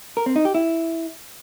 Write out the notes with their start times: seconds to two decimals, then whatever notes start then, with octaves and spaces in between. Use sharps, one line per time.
0.17 A#4
0.26 C4
0.36 D#4
0.45 G4
0.54 E4